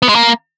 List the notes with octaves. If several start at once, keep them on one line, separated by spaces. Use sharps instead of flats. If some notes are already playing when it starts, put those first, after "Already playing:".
B3
G#3
A#3